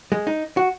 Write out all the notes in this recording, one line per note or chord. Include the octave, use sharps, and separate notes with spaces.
G#3
D#4
F#4